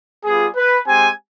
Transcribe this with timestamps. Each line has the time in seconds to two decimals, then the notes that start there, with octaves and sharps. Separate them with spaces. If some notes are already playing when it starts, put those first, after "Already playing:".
0.24 G3 B3 F4 G#4
0.56 B4
0.88 G#3 C4 G4 G#5